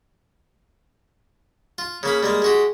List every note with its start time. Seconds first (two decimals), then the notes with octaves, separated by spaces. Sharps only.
1.78 F4
2.03 C#3 A#3 B5
2.23 G3 G#3 A#3
2.42 G#3 F#4 G4